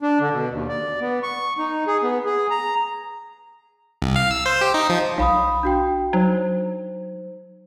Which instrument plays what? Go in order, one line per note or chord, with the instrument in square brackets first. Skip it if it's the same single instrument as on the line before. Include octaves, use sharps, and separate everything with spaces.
[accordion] D4
D3
B2
D#2
D5
B3
C#6
D#4
G#4
B3
G#4
A#5
[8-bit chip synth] C2
F5
E6
C5
G4
D#4
F3
[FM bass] B1 [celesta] F5 B5 D#6
[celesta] D4 F#4 G5
[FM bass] F#3 [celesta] D#4 C5